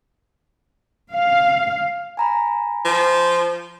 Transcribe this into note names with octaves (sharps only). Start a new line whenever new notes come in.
F5
G#5 A#5 B5
F3